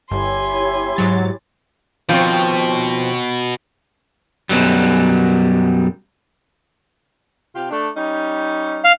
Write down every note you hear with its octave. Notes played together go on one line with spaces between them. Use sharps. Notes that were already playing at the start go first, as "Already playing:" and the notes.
G1 E4 G4 C#5 G#5 C6
G#2 F#3 A6
D#2 B2 F3 C4 C#5
F#2 B2 E3 F#3 G3
C3 F4 G4
A3 D4
G3 C#4 D#4
F5